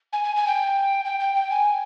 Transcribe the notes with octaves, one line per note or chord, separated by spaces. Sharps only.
G#5
G#5
G#5
G5
G5
G5
G5
G#5